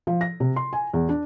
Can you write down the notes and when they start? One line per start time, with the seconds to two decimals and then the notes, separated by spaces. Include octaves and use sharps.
0.07 F3
0.21 A#6
0.40 C3
0.56 C6
0.73 G#5
0.93 E2
1.09 D4